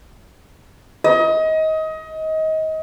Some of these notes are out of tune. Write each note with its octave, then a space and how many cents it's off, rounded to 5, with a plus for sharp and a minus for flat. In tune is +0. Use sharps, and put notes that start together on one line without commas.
D#5 +25